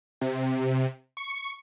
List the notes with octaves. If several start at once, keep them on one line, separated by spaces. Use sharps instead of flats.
C3
C#6